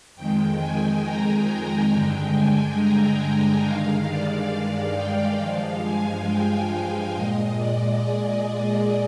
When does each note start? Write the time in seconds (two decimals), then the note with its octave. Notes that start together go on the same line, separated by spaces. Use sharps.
0.16 F2 D#3 G#3 G5
0.60 G#5
1.03 A#5
1.48 G#5
1.90 G2 D3 G#3 G5
2.35 G#5
2.78 A#5
3.22 G#5
3.65 G2 D#3 G#3 F5
4.09 D5
4.52 F5
4.96 G5
5.40 G2 F3 G#3 F5
5.83 G#5
6.27 G5
6.71 F5
7.14 A#2 G#3 D#5
7.57 D5
8.01 G#4